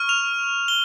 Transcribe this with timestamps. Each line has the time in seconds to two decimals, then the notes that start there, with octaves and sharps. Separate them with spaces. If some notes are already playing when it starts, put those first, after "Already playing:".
Already playing: C#6 F6
0.09 F7
0.68 G7